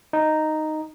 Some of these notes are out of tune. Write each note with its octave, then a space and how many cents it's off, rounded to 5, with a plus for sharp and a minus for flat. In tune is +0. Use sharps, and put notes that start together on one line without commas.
D#4 -5